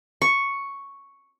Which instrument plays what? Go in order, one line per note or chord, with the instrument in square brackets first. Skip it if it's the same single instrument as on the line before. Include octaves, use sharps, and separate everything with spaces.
[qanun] C#6